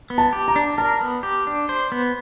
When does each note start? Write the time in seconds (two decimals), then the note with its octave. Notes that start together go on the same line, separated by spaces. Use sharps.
0.10 B3
0.18 A5
0.33 G4
0.48 A#5
0.56 D4
0.78 A#4 A5
1.01 B3
1.23 G4
1.47 D4
1.69 C5
1.92 B3